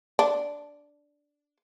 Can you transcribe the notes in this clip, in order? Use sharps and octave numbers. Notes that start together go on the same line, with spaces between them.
D4